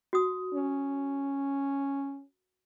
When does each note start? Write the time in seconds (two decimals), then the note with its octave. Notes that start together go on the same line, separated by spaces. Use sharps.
0.13 F#4 D#6
0.54 C#4